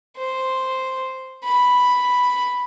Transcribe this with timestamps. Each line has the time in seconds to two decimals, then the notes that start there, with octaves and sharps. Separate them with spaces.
0.18 C5
1.44 B5